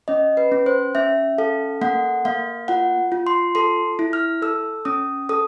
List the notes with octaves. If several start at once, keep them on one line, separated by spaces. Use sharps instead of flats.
C#4 D#5
B4
C#4
C5
C#4 E5
A4 F5
A#3 F#5
A#3 F5
F4 F#5
F4
C6
A4 C6
E4
F6
A4 E6
C#4 D#6
A4 D#6